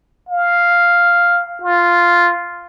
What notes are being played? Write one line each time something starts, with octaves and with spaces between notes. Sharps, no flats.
F5
F4